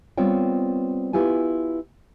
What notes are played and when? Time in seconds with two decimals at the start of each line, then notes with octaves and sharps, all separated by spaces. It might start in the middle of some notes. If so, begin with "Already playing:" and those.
0.18 G3 B3 C4 F4 C#5 G5
1.13 B3 E4 F4 G4 G#5